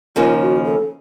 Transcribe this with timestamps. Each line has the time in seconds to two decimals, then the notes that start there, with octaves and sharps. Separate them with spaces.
0.16 D#2 C#3 F3 A#3 D#4 F4
0.41 F#4
0.65 A4